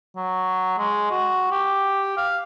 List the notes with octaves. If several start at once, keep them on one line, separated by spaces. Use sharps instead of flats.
F#3
G#3
F#4
G4
F5